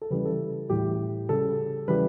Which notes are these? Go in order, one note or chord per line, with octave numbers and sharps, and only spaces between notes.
A4
C#3 E3 G3 B4
A4
A2 E3 G3 G4
C#3 G3 A4
C#3 E3 G3 B4